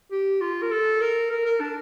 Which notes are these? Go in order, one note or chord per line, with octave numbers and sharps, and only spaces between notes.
G4
F4
A#4
A4
A#4
A#4
A#4
D4